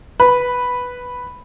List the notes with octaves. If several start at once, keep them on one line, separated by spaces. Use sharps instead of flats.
B4